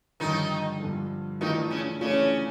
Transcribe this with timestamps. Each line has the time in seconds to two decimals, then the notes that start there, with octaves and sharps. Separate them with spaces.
0.20 G2 D3 D#3 F3 D#4
0.80 G2 D3 F3
1.41 D#3 E3 A3 D4 D#4 F4
1.70 C#3 C#4
2.01 C#3 E3 A3 C#4 D4 F4